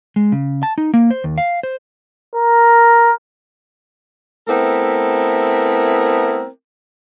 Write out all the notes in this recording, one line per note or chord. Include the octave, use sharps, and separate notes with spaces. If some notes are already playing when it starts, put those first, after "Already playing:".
G#3
C#3
A5
D#4
A#3
C5
D#2
F5
C5
A#4
A3 B3 C4 E4 A#4